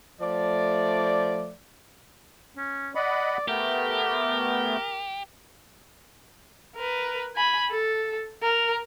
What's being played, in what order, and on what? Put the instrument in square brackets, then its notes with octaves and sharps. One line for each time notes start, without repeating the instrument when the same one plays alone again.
[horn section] F3 A3 D5
[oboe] C#4
[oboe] D5 [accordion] D#5 F#5 B5
[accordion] A3 B3 [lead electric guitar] G4 [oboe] A#4
[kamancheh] A#4 B4
G#5 B5
A4
A#4